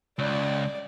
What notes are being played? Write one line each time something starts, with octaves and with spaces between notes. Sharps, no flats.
C#2 D5